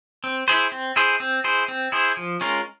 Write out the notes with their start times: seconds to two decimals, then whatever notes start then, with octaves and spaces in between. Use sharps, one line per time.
0.24 C4
0.48 E4 G#4 C5
0.72 C4
0.96 E4 G#4 C5
1.20 C4
1.44 E4 G#4 C5
1.68 C4
1.92 E4 G#4 C5
2.17 F3
2.41 G#3 C#4 F4 A#4